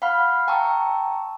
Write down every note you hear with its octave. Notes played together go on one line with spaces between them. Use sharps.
F5 F#5 B5 F6
G5 A5 A#5 C#6 E6